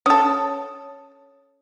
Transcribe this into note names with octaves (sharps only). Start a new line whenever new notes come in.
C#4 A4 D#6